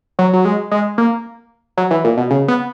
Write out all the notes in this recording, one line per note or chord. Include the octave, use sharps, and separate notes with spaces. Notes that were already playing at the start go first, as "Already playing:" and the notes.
F#3
F#3
G#3
G#3
A#3
F#3
E3
A#2
B2
C#3
B3